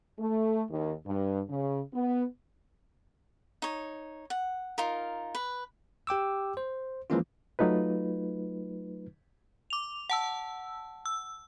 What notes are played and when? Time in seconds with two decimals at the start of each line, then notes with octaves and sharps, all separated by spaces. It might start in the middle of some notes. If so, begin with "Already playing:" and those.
0.19 A3
0.70 D#2
1.06 G2
1.49 C#3
1.94 B3
3.62 D#4 C#5
4.30 F#5
4.78 D#4 F4 A#4
5.35 B4
6.07 G4 G5 D6 E6
6.57 C5
7.10 E3 F3 G#3 A#3 C#4 F4
7.59 F#3 A3 D#4 F4 B4
9.70 D6 F7
10.10 F#5 A5 E6
11.06 E6